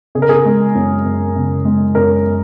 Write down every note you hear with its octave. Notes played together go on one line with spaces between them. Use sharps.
C#3 G#4
A#4
G#4
G#3
F#2
F#2
C#3
G#3
F#2 A#4